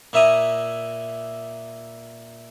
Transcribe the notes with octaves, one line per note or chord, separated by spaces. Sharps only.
A#2 A#3 E4 E5 A#5 D#6